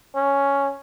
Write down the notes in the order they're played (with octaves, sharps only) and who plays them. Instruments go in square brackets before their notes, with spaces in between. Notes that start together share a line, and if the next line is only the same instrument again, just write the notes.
[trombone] C#4